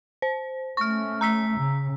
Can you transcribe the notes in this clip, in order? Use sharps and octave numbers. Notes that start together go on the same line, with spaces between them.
C5
A3 C#4 C#6 F6
A#5 E6 B6
C#3